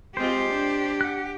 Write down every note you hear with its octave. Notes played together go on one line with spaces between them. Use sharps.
G#3 C4 F4 G4 C5
D4
F#5 F#6